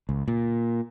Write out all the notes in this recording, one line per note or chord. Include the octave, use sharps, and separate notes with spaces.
C#2
A#2